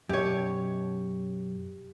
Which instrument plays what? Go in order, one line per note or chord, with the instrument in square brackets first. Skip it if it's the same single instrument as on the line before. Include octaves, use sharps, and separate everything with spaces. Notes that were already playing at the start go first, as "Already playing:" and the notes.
[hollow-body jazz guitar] F#2 B2 [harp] G4 C#5